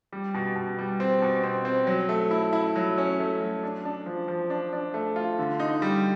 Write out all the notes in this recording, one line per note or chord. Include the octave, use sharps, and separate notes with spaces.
G3
B2
B2
G3
C4
B2
C4
C4
F#3
A3
E4
E4
F#3
C#4
A3
F#3
D4
D4
F3
F3
D4
D4
A3
F4
D3
D#4
G3